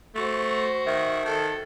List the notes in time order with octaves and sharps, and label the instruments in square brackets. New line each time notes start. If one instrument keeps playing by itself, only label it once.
[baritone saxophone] A3 [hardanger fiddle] F#4 C5
[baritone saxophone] D#3 [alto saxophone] E5
[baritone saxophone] D#3 [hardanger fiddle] A4